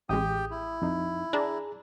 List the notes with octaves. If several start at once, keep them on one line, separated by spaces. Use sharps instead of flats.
A1 G#3 G4 G5 D#6
E4
F2 D#4
D4 G#4 A#5